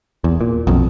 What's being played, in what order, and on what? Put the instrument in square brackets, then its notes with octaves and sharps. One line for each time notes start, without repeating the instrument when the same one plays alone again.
[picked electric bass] E2
A#2
B1 F2